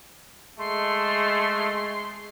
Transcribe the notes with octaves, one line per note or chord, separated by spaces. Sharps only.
G#3 A3 C6